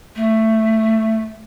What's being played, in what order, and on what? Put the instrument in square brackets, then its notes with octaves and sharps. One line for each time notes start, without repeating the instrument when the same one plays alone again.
[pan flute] A3